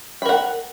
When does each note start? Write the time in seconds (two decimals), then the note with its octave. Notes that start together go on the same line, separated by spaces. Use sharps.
0.22 B5
0.25 A#4
0.29 F#5